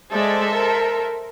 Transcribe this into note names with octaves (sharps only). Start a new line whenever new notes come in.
G#3 A4 C5 D5 E5
A#4